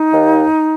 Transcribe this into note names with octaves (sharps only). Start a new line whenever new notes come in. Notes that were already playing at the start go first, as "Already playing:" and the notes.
Already playing: D#4
D#2